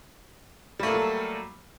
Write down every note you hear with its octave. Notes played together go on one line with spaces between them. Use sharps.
F#3 G3 A3 A#3 A4